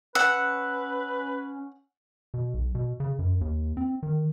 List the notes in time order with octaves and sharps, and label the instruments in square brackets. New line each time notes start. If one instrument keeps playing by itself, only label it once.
[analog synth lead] C#4 [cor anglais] B4 [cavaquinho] F#5 [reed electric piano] E6
[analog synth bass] B2
B1
B2
C#3
F#2
D#2
C4
D#3